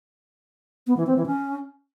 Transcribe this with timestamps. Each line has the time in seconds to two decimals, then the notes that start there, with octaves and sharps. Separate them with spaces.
0.87 B3
0.97 E3
1.07 C4
1.16 E3
1.26 C#4